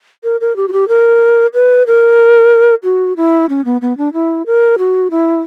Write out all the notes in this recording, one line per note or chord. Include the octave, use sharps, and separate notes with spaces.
A#4
A#4
G4
F#4
G4
A#4
B4
A#4
F#4
E4
C#4
B3
B3
D4
E4
A#4
F#4
E4